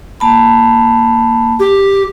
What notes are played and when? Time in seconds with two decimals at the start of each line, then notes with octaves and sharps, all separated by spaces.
0.20 A#3 A5 B5
1.60 G4